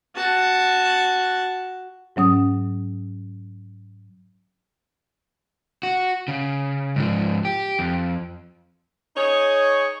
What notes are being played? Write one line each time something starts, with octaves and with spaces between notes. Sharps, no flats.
F#4 A5
G#2 F#3 C#4 D#6
F#4
C#3
G#2 F3
G4
F2
D#4 G#4 C#5